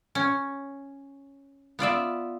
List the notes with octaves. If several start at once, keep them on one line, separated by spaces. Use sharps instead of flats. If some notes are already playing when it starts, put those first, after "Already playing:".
C#4
B3 F4 D5 E5